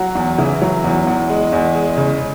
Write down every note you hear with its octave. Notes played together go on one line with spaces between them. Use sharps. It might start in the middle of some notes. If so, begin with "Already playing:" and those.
Already playing: F#3 F#4
E2
C#3 E3 E4
F#3
E2
E2
G#3
E2
G#3
C#3